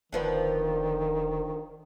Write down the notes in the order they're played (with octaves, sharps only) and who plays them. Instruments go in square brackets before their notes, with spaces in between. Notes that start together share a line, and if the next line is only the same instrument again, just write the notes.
[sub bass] E1 [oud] D3 F3 B3 [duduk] D#3